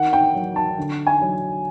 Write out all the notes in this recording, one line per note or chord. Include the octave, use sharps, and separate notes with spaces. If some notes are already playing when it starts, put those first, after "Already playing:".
Already playing: D#3 F#5
G5
F#3
A5
D3
G#5
F#3